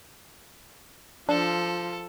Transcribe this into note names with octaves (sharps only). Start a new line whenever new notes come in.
F3 D4 F4 A4